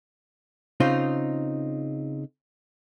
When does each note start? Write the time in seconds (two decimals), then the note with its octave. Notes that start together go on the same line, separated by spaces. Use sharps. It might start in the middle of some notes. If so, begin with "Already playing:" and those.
0.80 C#3 C4 D#4 F4